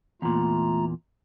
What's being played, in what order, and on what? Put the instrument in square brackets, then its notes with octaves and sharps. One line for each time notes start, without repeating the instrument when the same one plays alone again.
[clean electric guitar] E2 A#2 [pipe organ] A3 F4 A#5